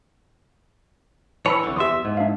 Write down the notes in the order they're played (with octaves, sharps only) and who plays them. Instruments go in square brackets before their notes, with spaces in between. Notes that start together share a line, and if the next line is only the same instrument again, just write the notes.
[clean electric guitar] E3 C#5 [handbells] A5 B5 E6
[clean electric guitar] C2 D3
[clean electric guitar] E2 E5 [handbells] G4 C6 D#6
[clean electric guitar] G#2
[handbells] D4 E5 F5